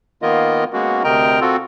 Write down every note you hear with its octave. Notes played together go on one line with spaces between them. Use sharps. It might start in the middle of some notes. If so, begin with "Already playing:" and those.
D#3 A#3 B3 F4 A#4 D#5
G#3 A#3 B3 C#4 F#4
D2 C3 A#4 D#5 G5 A#5
C4 F4 F#4 A4